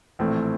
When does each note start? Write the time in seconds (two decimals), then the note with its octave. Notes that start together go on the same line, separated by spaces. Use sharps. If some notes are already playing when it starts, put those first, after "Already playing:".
0.19 A#1 A2 E3 A3 C4